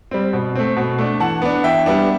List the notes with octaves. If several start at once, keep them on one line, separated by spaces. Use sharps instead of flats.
G3 C4
B2
A3 C4
B2
A3 D4
E3 F#5 A5
B3 D4
E3 E5 G5
G3 B3 D4